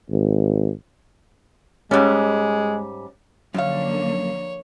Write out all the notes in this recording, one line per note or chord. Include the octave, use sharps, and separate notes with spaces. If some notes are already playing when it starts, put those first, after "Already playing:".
G#1
G#2 G3 G#3 C#4
F#2 D3 F3 A#3 C#5 F5